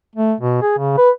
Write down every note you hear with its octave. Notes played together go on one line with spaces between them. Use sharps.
A3
B2
G#4
C#3
B4